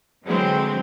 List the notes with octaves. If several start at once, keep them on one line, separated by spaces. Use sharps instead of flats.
D3 E3 F#3 G#3 C4